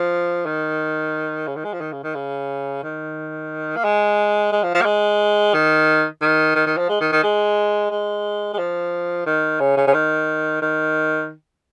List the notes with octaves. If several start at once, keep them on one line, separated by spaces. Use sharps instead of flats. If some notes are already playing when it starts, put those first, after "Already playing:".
Already playing: F3
D#3
C#3
D#3
G#3
F3
D#3
C#3
D#3
C#3
D#3
A#3
G#3
G#3
F3
F3
A#3
G#3
D#3
D#3
D#3
D#3
F3
G#3
D#3
D#3
G#3
G#3
G#3
F3
D#3
C#3
C#3
C#3
D#3
D#3